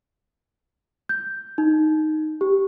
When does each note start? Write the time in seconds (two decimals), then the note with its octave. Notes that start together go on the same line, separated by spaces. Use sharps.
1.09 G6
1.58 D#4
2.41 G4